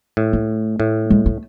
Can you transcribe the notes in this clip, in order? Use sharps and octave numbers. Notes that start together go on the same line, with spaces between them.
A2
A3
A2
G#3
A3